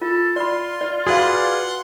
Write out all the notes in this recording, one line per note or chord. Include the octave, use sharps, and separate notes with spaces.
F4 A4
F4 D5 B5 C6
D5
F#4 G#4 B4 D5 F5 F#5 C6